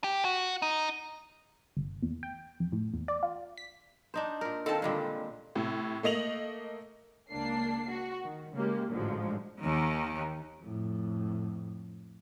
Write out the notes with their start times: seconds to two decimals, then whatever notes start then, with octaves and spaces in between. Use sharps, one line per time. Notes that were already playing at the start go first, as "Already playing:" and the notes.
0.04 G4
0.25 F#4
0.62 D#4
1.77 G1
2.02 E2
2.23 G5
2.60 F2
2.72 A2
2.94 E2
3.08 D5
3.23 F4
3.57 B6
4.14 D4 D#4 C5
4.41 A#2 A#4
4.66 D#3 C4 F4 A4 A5
4.82 A#2 D3 D#3 G3 G#3
5.56 A2 C3
6.03 A3 A#3 D#5 F7 F#7
7.31 C#2 A#3 D4 C7
7.90 F#4
8.24 D#3
8.54 C#3 G#3 A#3 G4
8.90 A1 G#2 D3 F3 F#3 G#3
9.60 D#2 D#3
10.60 F2 A2